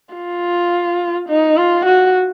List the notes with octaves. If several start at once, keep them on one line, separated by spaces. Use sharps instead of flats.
F4
D#4
F4
F#4